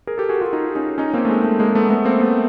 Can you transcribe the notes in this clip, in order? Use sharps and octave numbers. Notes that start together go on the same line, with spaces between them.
G#4 A#4
G4 A4
F#4 G#4
F4 G4
D#4 F4
C#4 D#4
C#4 D#4
A#3 C4
A3
G#3
A3
G#3 A#3
A3 B3
A3 B3
A#3 C4
A3 B3